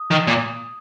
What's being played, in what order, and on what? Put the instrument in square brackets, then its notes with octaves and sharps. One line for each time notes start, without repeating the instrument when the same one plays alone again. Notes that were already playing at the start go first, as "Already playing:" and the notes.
Already playing: [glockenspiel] D#6
[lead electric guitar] D#3
A#2